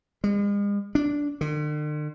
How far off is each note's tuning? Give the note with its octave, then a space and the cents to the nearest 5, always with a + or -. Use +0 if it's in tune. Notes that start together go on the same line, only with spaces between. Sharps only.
G#3 -40
D4 -10
D3 +45